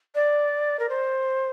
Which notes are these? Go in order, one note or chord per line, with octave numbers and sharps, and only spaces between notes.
D5
A#4
C5